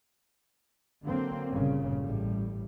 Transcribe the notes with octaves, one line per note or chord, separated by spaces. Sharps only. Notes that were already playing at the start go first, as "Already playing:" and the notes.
D3 F#3 A#3 C4
G1 A#2 C#3 G3
A1 A2 G3